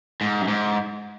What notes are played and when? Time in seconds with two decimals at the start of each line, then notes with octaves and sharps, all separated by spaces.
0.21 G#2
0.41 F#2
0.48 G#2